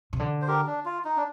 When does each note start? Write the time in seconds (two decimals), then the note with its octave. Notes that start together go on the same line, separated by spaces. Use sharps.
0.13 C3
0.20 D3
0.41 C5
0.48 G4 A#4
0.67 D4
0.85 F4
1.05 D#4
1.17 D4